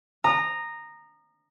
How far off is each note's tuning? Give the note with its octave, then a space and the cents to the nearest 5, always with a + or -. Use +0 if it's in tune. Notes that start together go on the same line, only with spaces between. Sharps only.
A#5 -5 D#6 -25